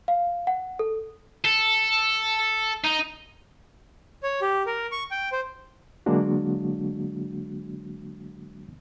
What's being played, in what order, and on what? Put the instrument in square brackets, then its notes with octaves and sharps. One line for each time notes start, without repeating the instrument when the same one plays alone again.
[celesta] F5
F#5
A4
[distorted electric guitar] A4
D#4
[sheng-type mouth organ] C#5
G4
A#4
C#6
G5
C5
[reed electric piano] D3 F#3 G#3 A#3 D4 F#4